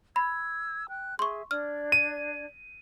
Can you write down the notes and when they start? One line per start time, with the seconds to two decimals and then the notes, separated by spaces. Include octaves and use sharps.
0.16 B5 E6 G#6
0.89 G5 F#6
1.19 G#4 E5 C6 C#6
1.51 D4 D5 F6 G#6
1.92 D#7